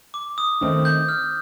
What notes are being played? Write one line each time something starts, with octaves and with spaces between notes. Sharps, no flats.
D6
D#6
D#3 A3 C4
G6
F6